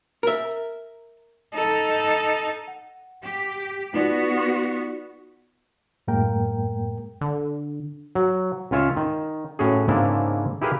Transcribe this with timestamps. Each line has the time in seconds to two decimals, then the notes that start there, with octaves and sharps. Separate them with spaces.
0.23 A#4 E5
1.54 D#4 A4
2.68 F#5
3.24 G4
3.94 B3 D#4 F4 F#4 D5
6.08 F#2 A2 G#3 A#3 A#4 G5
7.21 D3
8.15 F#3
8.71 C#2 C#4 F4 C#5 E5 F5
8.97 D#3
9.59 A2 C#4 F#4 G#4
9.88 G#2 C#3 A#3 C4 D4 E4
10.62 E4 G4 G#4 A#4 B4 F5